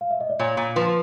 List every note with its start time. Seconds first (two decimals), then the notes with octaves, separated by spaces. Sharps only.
0.01 F5
0.11 E5
0.21 D#5
0.30 D5
0.39 A#2 C#5
0.57 A#2
0.76 F3 B4